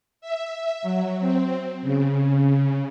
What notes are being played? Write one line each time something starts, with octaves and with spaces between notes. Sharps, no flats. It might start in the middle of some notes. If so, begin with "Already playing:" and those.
E5
F#3
C4
C#3